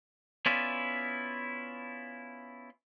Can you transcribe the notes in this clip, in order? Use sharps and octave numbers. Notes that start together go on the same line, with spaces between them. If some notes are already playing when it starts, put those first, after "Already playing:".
B3 C#4 E4 F4 D5